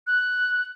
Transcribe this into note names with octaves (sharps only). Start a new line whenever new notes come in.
F#6